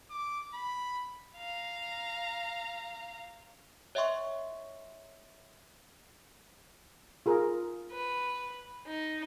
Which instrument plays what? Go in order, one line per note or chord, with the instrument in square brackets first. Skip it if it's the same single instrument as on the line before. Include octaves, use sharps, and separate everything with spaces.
[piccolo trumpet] D6
B5
[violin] F5 A#5
[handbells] C#5 D#5 E5 G5 C6 C#6
[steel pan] F4 G#4 A#4
[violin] B4
D#4